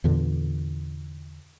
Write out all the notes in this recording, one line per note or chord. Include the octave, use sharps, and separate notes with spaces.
E2 A#2 D3 E3